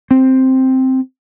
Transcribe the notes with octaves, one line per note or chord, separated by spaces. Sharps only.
C4